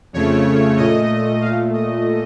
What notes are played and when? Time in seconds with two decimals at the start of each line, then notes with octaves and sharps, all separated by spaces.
0.13 F2 C#3 A3 C#5
0.77 A#2 A3 D#5
1.41 A#2 A3 F5
1.74 D#5